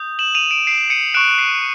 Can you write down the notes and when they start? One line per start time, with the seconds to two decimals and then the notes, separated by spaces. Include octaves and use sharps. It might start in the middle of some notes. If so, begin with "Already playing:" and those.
Already playing: D#6 G6
0.19 E7 F#7
0.35 D#7 F7
0.51 D7 E7
0.67 C7 D7
0.90 C#7 D#7
1.14 C#6 F#6 D7 E7
1.38 C7